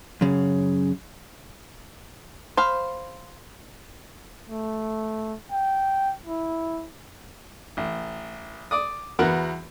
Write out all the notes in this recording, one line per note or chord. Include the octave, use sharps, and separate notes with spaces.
F#2 C#3
C5 F5 B5
A3
G5
E4
A1
D5 D#6
E2 B3 F#4 A#4 F#5